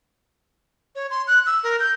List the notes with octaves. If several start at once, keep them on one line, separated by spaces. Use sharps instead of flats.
C#5
C6
F#6
E6
A#4
G6